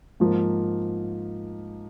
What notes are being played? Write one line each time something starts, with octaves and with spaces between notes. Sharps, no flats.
G#2 F3 A#3